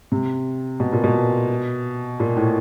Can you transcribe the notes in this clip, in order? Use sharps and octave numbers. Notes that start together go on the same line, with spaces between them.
C3
B2
A#2
B2
A#2
A2